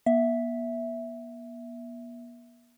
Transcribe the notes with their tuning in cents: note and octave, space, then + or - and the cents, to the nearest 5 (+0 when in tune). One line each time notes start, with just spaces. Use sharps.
B3 -45 E5 +0